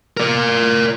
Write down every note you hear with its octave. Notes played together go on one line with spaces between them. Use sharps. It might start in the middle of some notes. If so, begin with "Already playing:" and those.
A#4 D5